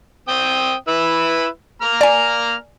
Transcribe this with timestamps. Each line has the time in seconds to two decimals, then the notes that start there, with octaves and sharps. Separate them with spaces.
0.29 C4 G5 D#6
0.88 E4 B4 E6
1.82 A#3 A#5 F6
2.01 D5 G#5